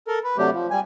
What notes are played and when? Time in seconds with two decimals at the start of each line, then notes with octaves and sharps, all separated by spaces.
0.08 A4 A#4
0.24 B4
0.38 C3 F#3 A3 D4 G4
0.52 F3
0.71 G3 G#5